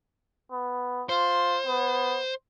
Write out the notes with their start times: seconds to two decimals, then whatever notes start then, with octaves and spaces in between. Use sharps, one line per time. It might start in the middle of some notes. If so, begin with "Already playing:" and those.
0.52 B3
1.09 F4 C5
1.66 B3